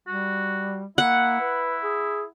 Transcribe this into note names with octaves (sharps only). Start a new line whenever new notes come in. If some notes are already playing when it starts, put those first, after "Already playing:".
G3 F#4
A#3 E4 F#5
B4
G#4